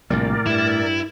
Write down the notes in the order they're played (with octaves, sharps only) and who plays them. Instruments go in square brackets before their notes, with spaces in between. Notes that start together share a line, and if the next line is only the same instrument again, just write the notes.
[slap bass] A#1 C3 G3 [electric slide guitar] A2 [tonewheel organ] A#4 D5
[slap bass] G2 [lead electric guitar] E4